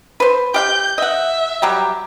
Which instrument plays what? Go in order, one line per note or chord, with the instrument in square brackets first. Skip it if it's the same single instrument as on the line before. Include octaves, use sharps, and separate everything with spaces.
[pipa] B4 C5
[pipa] G4 F5 G5 [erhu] G6
[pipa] D#5 F#5 [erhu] E5
[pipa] F#3 G3 G4